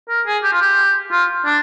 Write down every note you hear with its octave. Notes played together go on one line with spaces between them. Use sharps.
A#4
G#4
G4
F4
G4
F4
D4